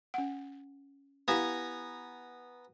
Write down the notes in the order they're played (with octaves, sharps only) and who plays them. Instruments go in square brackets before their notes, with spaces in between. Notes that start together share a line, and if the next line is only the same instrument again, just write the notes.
[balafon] C#4 F#5
[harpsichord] B3 G#5 A#5 [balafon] E4 G4 F5